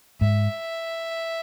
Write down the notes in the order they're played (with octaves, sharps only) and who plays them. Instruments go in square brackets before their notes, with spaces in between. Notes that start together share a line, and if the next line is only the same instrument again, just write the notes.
[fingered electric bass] G#2 [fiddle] E5